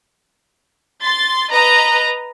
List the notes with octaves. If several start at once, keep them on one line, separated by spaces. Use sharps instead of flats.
C6 A6
B4 D#5 A#5